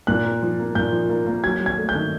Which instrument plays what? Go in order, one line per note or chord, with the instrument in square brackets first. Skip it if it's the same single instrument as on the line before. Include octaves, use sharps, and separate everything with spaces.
[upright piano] A#2 [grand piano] F#6
[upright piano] A#3
F3
A#3
[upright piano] A#2 [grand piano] G6
[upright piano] F3
A#3
A#3
[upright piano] F#3 [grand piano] G#6
[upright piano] F#3
[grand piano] G#6
[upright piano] A3
[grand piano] G6
[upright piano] D#3